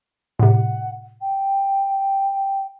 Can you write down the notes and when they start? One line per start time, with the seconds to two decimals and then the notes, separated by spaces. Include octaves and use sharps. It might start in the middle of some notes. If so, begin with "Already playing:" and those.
0.39 A2 C3 F#5
1.21 G5